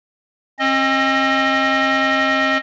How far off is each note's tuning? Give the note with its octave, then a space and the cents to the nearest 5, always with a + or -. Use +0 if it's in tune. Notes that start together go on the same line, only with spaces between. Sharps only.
C4 +45 D#5 +0